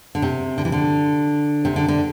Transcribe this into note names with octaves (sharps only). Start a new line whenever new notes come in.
D3
C3
D3
E3
D3
C3
D3
D3